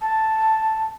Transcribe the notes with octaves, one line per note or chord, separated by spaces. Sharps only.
A5